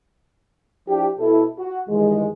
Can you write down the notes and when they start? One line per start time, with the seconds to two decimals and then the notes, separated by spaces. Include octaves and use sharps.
0.88 F3 D4 E4 G4
1.19 B2 E4 A4
1.59 F#4
1.89 G2 D#3 E3 G#3